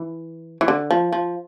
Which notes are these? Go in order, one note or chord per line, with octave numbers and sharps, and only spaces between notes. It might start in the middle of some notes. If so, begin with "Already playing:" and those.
Already playing: E3
E3
D3
F3
F3